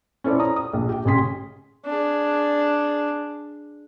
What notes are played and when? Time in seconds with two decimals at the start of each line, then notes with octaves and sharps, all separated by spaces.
0.24 C#4 E4 A4 C5 D5
0.39 A#5 D#6
0.56 D#6
0.73 A#1
0.89 G4 G5
1.05 A1 C#3 C#4 G#4 C6 B6
1.86 D4 G#4